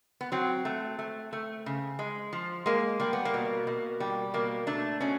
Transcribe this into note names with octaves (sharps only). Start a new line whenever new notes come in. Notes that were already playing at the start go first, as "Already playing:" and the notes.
B3
F#3 C4
A3
A3
A3
C#3
G#3
F3
G#3 A#3
G3 A#3
B3
A#3
B2
B2
G3
B2 A#3
A3 D4
B2 C#4